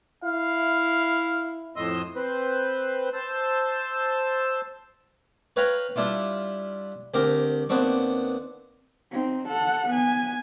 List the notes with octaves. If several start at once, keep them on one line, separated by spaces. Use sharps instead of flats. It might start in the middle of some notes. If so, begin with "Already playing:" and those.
E4 F5
F2 A2 D#5 C6 E6
C4 B4 C5
C5 A5 E6
B4 C#5 F5 G5 A#5 B5
G3 D4 E4 F4
D2 C4 G4 A#4
D#2 B3 C4 D4 C#6
C4 D#4
A4 F#5
B3 G#5